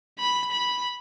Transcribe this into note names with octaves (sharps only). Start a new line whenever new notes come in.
B5
B5